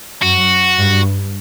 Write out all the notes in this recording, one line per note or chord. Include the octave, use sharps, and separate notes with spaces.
F#2 F#4
G2